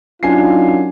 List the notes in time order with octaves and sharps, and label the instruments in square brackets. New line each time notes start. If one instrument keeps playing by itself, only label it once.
[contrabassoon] F#2 [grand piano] D4 G#5 C7 [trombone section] D#4 F4